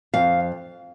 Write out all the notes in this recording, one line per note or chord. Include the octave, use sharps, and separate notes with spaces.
F2 F5